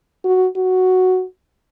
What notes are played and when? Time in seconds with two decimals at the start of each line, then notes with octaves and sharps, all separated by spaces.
0.25 F#4
0.56 F#4